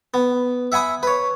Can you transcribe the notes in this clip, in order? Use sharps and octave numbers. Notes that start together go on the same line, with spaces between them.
B3
E5 F#5 G#5 B5 D#6
B4 C#5